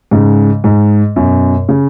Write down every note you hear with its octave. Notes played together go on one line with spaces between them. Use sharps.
G#2 C#3
G#2
F#2 B2
C#3